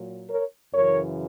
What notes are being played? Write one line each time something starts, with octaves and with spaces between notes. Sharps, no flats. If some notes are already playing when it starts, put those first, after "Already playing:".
Already playing: A#2 F#3
A#4 C#5
F#2 C#3 E3 A#4 C#5